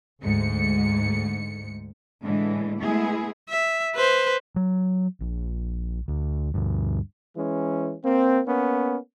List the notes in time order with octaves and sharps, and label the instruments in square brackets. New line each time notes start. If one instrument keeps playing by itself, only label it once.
[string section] D2 G#2 C#7
[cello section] A2 D3 E3 G#3
G#3 A3 B3 E4 G#4
[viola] E5
B4 C5
[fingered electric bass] F#3
A#1
D2
D2 G2
[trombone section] E3 G#3 C#4
A#3 C4
A#3 B3 C#4